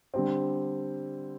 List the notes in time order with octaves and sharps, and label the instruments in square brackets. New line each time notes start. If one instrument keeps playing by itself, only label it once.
[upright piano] D3 G3 C4